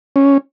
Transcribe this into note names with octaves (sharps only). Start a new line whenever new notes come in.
C#4